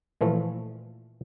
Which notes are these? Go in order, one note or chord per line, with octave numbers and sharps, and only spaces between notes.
A#2 E3 F3 A3